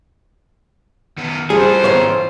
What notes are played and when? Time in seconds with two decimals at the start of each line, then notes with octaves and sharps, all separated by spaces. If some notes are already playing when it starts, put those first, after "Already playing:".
1.18 D#3 B3
1.50 E3 G3 F4 G#4 A4 C5
1.84 G#2 D#3 B3 C#5